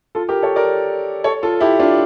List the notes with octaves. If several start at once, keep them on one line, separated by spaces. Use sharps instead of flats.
F4 A4
G4 A#4
A4 C#5
A#4 D5
A4 C#5
F4 A4
E4 G4
D4 F4